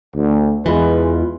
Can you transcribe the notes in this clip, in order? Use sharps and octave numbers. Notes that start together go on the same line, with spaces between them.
D2
E2 E3 G#3 F4 B4